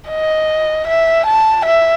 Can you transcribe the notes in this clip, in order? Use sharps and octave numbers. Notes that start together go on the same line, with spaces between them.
D#5
E5
A5
E5